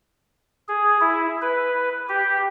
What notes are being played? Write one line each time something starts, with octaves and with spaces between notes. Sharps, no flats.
G#4
E4
B4
G4